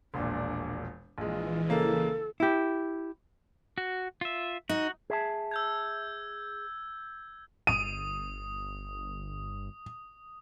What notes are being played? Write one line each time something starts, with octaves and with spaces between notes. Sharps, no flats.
E1 A#1 A#2 D4
A#1 E3 G#3 F4
C#3 A#3 A4
E4 G4
F#4
F4 E5
D#4 F#4
G#4 E5 A5
E6 G6 G#6
G1 D#6 D#7